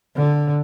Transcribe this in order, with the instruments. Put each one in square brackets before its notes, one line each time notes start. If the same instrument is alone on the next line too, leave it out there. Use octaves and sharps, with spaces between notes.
[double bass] D3